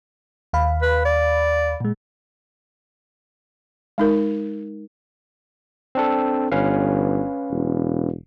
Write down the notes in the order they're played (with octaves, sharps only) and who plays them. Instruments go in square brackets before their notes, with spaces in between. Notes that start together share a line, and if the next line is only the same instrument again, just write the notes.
[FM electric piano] D#2 F5 B5
[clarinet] B4
D5
[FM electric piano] A#2 G#3
[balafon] G#3 D#4 A#4
[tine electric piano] C4 D4 A4
[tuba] G1 [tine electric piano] C#4 B4 F5
[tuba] E1